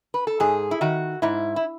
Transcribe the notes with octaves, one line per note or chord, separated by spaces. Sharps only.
B4
A4
G#2 G#4
E4
D#3 F#4
G#2 E4
E4